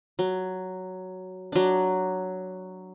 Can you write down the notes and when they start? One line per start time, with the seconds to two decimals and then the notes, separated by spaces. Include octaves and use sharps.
0.19 F#3
1.52 F#3 D4